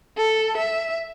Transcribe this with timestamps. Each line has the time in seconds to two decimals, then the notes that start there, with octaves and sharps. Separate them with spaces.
0.17 A4
0.57 E5